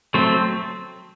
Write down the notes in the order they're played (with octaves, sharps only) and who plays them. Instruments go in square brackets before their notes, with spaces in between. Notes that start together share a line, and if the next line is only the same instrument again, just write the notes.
[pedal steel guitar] F#3 A3 C4